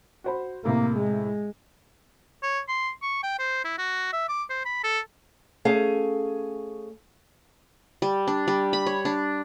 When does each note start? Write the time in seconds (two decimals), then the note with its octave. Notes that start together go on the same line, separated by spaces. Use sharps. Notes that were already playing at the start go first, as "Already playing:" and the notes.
0.24 F#4 C5 B5
0.65 A2 C3 A#3
0.97 G#3
2.43 C#5
2.68 C6
3.02 C#6
3.23 G5
3.39 C5
3.65 E4
3.78 F#4
4.13 E5
4.29 D6
4.50 C5
4.65 B5
4.84 A4
5.65 A3 C#4 G#4 F5
8.02 G3
8.28 D4
8.48 G3
8.73 B5
8.86 C#5
9.05 D4